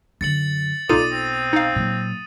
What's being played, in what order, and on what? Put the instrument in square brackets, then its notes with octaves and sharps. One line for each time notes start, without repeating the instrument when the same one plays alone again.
[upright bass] F#2 D3 [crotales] A6 C#7 F#7
[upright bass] B1 B2 [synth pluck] D#4 F4 A4 [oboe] D5 [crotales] D#6 D#7
[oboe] C4
[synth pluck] D#4 F5
[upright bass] A#2 F#3